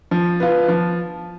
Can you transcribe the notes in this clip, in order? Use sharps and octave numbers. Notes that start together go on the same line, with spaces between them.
F3
B3 F4
F3